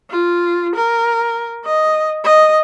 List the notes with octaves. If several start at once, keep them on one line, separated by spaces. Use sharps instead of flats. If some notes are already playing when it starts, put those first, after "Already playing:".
F4
A#4
D#5
D#5